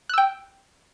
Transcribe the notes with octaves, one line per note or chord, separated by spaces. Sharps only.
G5 E6 F#6